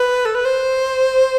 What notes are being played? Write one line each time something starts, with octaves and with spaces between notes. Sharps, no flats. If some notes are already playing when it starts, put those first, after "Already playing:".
Already playing: B4
A4
B4
C5